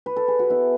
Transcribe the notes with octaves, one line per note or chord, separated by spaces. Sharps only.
B4
A4
G#4
F#4
B3 E4